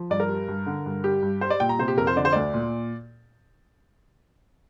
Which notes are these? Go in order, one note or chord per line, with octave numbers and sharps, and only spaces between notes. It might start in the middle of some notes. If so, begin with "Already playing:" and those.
Already playing: F3
G2 D5
A#4
G3
G2
D3
G2
G3 G4
G2
G3 C5
D5
A#2 G5
A#5
C3 C5
G4
F2 A#4
C5
D3 D5
C5
D2 D5
A#2